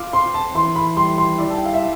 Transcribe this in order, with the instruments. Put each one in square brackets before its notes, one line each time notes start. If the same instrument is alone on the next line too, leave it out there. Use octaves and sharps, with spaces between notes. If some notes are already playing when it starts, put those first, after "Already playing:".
Already playing: [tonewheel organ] F4 [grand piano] D6
[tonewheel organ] C4 [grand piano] C6
[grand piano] A5
[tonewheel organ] E3 [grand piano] C6
[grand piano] B5
[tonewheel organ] G3 [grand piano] C6
[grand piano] C6
[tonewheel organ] E4 [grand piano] D5
[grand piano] A5
G5
F5
E5